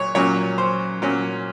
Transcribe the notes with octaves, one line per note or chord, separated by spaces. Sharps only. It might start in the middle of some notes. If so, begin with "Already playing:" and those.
Already playing: A#2 F#3 C#5
A#2 F#3 C#4 C#5
C5
A#2 F#3 C#4